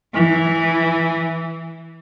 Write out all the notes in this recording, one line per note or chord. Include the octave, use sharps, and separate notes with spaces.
E3